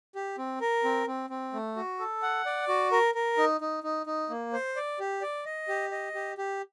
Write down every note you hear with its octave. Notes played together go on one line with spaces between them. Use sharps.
G4
C4
A#4
C4
C4
C4
A3
F#4
A4
F#5
D5
F#4
A#4
A#4
D#4
D#4
D#4
D#4
A#3
C5
D5
G4
D5
D#5
G4
D#5
G4
G4